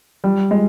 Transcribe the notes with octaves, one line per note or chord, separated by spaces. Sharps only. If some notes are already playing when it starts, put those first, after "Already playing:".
G3
G#3